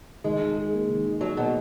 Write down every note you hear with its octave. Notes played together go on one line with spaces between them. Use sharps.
D#3 G#3
D#4
G#4
A#3
D#3
D#4
F#3 G#4
B2 A#3